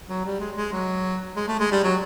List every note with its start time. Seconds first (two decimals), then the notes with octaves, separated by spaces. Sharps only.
0.09 F#3
0.25 G3
0.40 G#3
0.57 G#3
0.72 F#3
1.36 G#3
1.48 A3
1.60 G#3
1.72 G3
1.84 F#3